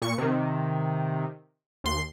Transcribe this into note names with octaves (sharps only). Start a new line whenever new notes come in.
A#2 C#6 C#7
C3 D#3
D#2 C6